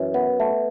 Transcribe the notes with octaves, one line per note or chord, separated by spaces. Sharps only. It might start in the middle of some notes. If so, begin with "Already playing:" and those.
Already playing: F#2 E3
B3
A3